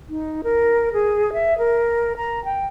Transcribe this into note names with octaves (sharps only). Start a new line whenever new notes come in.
D#4
A#4
G#4
E5
A#4
A#5
G5